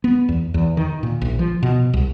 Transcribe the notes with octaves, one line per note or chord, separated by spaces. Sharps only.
B3
E2
E2
D#3
A#2
A#1
F3
B2
C2